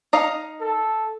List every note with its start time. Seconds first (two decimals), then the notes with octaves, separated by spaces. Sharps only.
0.13 D#4 D#5 F5
0.61 A4